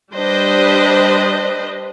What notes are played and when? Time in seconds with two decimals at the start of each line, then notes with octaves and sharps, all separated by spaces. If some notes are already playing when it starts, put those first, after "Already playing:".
0.15 G3 D4 B4 C5 D#5